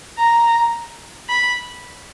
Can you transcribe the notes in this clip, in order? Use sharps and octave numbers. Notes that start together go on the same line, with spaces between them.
A#5
B5